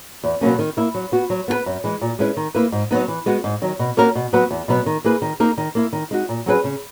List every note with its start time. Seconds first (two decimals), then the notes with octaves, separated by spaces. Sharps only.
0.23 E2
0.41 B2 F#3 A#3 C#4
0.59 D#3
0.77 A#3 E4
0.95 F#3
1.12 B3 F#4
1.30 F#3
1.48 B3 F#4 B4
1.66 F#2
1.84 E3 G#3
2.01 A#2
2.19 G#3 C#4 E4 B4
2.37 D#3
2.55 A#3 E4 B4
2.72 G#2
2.91 F#3 B3 D#4
3.08 E3
3.26 G#3 B3 F#4
3.44 G#2
3.62 D#3 F#3
3.79 B2
3.97 A#3 C#4 F#4 A#4
4.15 B2
4.33 F#3 B3 F#4 B4
4.51 E2
4.68 B2 F#3 B3
4.86 D#3
5.04 A#3 E4 G#4 B4
5.22 D#3
5.40 A#3 D#4 A#4
5.58 D#3
5.75 A#3 E4
5.93 D#3
6.11 G#3 D#4 F#4
6.29 A#2
6.46 F#3 C#4 G#4 B4
6.64 C#3